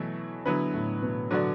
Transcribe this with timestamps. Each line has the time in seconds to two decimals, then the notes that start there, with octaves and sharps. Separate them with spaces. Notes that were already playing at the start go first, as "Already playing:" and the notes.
Already playing: B2 E3 F#3 A3 E4
0.46 D3 F#3 B3 E4 B4
0.74 A2
1.02 B2
1.31 D3 F#3 B3 F#4 D5